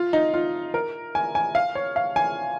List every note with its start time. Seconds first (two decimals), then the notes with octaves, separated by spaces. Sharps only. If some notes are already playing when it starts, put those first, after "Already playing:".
Already playing: F4
0.13 D#4
0.34 F4
0.74 A#4
1.15 G#5
1.35 G#5
1.55 F5
1.75 C#5
1.96 F5
2.16 G#5